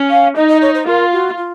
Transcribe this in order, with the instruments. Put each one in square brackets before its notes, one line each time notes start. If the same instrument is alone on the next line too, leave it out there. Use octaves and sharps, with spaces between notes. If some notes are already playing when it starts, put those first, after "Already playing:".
Already playing: [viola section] C#4
[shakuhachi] F5
[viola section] D#4 [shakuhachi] D#5
[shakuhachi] D#5
C#5
C5
[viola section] F4 [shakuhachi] A#4
[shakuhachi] F#4
F4